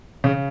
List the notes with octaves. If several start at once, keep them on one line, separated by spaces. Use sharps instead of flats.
C#3